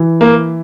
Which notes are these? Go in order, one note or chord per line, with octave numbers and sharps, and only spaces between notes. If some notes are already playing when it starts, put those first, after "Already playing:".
Already playing: E3
A#3